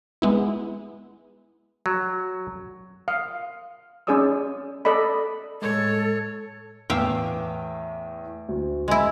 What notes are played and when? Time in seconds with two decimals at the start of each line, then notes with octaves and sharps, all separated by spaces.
0.22 G#3 B3 E4
1.86 F#3
3.08 F5 D#6
4.07 C#4 D#4 G#4 D5 D#6 E6
4.85 A4 D5 D#5 B5
5.62 A2 G#3 A4 C#5
6.90 E2 A2 E5 F5 G5 D6
8.49 D2
8.88 G#3 E4